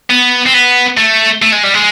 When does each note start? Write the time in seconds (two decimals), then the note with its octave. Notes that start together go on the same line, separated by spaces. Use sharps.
0.10 B3
0.46 C4
0.54 B3
0.97 A3
1.42 A3
1.53 G#3
1.64 G3
1.74 G#3